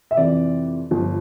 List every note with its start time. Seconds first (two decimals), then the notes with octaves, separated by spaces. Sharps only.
0.11 E5
0.17 F2 C3 E3 D5
0.91 G1 G2 F3